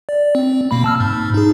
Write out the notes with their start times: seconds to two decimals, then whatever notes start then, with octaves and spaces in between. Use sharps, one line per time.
0.09 D5
0.35 C4
0.71 B2 A#3 B5
0.84 A5 E6 F6
1.00 G#2
1.34 D#4 G#4